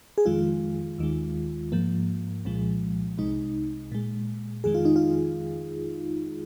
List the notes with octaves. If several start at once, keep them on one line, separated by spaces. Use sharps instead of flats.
G#4
F2 D#3 G#3 F4
D#2 D#3 G#3
G#2 F3 A#3
C2 A#2 F3 G#3
C2 C3 G#3 D#4
A#2 G#3
F2 D#3 G#3 G#4
F4
D#4
F4